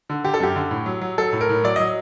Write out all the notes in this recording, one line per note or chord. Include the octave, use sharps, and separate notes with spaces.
D3
D3 G4
A4
F#2 G4
D3
A2
F#3
F#3
F#3 A4
A2
A#4
A2
F#3 D5
F#3 D#5